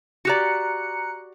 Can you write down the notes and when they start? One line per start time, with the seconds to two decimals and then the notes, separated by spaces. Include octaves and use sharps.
0.25 F#4 G4 D5 A#5 F#6 C#7